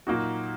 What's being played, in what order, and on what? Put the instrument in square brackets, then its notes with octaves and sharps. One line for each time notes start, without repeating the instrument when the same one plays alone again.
[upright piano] A#2 F#3 A#3 D#4 F#4